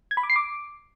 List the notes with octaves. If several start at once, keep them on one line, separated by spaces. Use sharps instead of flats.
G#6
B5
D6
C7
D6